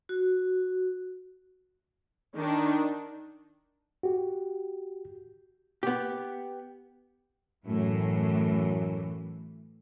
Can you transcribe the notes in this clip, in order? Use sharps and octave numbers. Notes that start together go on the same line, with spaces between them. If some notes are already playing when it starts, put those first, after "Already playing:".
F#4
D#3 D4
F#4 G4
B3 G4
F#2 A2 E3